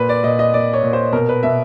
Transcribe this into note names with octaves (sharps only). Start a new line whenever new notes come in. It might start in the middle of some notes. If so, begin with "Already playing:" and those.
Already playing: A#2 B4
D5
A#2 D#5
D#5
A#2 D5
C#5
A#2
C5
B2 A#4
B4
B2 E5